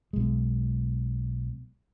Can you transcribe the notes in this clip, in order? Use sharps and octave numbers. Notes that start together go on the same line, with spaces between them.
B1 G#3